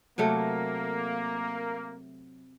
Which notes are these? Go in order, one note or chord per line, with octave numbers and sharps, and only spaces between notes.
C3 F#3 A3 A#3